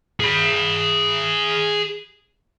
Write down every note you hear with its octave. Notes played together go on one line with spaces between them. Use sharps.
G#4 B5